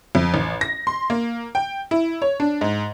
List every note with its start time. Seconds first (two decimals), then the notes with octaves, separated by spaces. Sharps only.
0.15 F2
0.34 A1
0.61 A#6
0.87 C6
1.10 A#3
1.55 G5
1.91 E4
2.22 C#5
2.40 D4
2.61 G#2